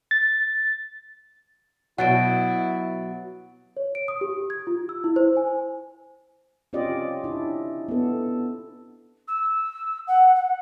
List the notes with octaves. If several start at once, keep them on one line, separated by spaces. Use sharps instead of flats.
A6
B2 F#3 E4 F#5 A6 D7
C#5
D7
D#6
G4
G#6
F4
E6
E4
C5
G#5
C4 C#4 F4 G4 D5 D#5
D4 E4
B3 A4
E6
F#5
F#5